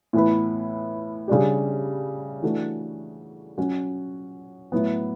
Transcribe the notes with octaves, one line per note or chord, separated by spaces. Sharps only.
A2 E3 B3 E4 B4
C#3 G3 D4 G4
E3 A3 D4 F#4 A4
F#3 C#4 F#4
A2 F#3 B3